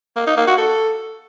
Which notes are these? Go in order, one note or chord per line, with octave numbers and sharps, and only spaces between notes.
A#3
D#4
A#3
F#4
A4